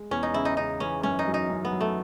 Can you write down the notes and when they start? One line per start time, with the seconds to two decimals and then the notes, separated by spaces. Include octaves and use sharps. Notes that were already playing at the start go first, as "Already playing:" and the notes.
Already playing: G#3
0.11 E2 C#4
0.23 D#4
0.34 C#3 E4
0.45 D#4
0.57 C#3 D#4
0.80 E3 C#4
1.03 F#2 C#4
1.19 D#4
1.27 F#3
1.34 D#4
1.50 F#2
1.65 B3
1.73 F#3
1.81 A3